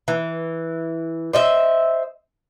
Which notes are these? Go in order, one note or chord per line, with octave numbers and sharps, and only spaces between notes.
E3
C5 D#5 E5